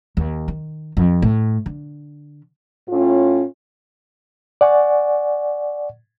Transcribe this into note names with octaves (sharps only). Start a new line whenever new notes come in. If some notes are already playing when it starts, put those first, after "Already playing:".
D#2
D#3
F2
A2
D3
A2 C#4 F4
D5 F#5 G#5 C#6